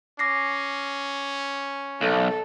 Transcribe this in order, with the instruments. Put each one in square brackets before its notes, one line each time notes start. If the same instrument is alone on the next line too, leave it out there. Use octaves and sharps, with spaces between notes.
[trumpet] C#4 [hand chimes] D6 A#6 C7
[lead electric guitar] B1 [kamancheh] A4